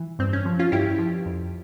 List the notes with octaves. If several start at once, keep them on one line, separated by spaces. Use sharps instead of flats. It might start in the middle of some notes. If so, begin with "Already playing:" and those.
Already playing: E3
G2 C4
C#4
F3
C#4 F4
G2 E4 G4
F3
F2